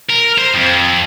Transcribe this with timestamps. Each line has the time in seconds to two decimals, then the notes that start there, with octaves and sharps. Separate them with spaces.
0.10 A#4
0.38 C5
0.54 F2